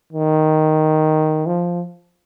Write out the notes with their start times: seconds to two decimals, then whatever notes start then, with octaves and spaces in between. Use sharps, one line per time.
0.13 D#3
1.46 F3